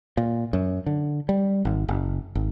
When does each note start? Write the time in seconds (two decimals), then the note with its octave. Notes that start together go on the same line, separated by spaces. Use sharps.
0.17 A#2
0.53 F#2
0.86 D3
1.29 G3
1.65 G#1
1.88 F#1
2.35 G#1